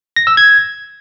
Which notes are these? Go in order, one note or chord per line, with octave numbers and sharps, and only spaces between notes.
A#6
E6
G#6